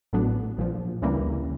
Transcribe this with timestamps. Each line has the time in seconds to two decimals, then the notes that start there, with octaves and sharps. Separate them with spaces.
0.13 A1 A2 F#3 B3 D4
0.58 A#1 A#2 F3
1.02 D2 C#3 E3 G3 A#3